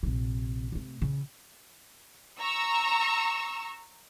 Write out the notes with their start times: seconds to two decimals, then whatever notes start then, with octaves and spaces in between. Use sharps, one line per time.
0.03 A#1 C3
0.72 C3 A3
1.02 C#3 E3
2.39 A#5 C#6 E6